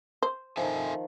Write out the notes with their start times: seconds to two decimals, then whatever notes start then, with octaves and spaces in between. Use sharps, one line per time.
0.23 C5
0.57 D#3 F3 A4 E5 G#5